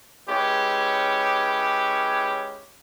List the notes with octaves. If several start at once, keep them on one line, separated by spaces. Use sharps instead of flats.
G#3 C#4 E4 G4 B4 C#5